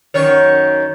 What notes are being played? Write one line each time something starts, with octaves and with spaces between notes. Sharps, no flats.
F#2 D#3 C#5